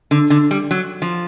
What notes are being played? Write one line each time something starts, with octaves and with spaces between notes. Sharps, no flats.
D3
D3
G3
F#3
F3